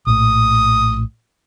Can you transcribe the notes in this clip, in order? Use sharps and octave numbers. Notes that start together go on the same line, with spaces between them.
A#1 A2 D#6